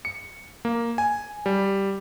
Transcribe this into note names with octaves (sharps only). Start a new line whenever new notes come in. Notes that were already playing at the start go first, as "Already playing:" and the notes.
C#7
A#3
G#5
G3